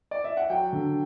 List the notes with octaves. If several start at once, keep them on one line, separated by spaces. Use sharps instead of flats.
D5
E5
F#5
F#3 G5
D3